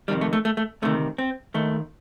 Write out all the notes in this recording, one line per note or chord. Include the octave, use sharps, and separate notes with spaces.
F2 C3 D#3 G3
A3
A3
A3
A3
D2 C3 D#3 A3
C4
D#2 D#3 A3